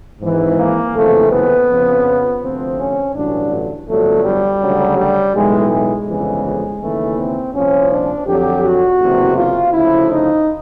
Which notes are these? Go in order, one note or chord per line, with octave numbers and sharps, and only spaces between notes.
G#1 G#2 E3
A#3
F#1 F2 C3 E3 A3
B3
F2 C#3 F3
D2 C3 F3 C4
C#4
A1 G2 D3 F#3 D4
G1 F2 D3 F#3 A3
G3
D2 C#3 F#3
G3
B1 A2 E3 G#3
G#3
G1 F2 C#3 E3
D#2 C#3 E3 A3
C4
C2 A#2 F3 C#4
D4
F2 D3 F#3 G4
F#4
F#1 E2 C3
F4
D2 C#3 F3 E4
D#4